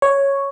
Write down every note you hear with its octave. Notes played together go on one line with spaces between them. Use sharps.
C#5